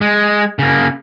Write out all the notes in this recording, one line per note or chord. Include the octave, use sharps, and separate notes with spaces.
G#3
C#3 A#3